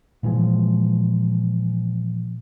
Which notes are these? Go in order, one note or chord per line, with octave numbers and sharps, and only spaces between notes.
A#2 E3 F3 G#3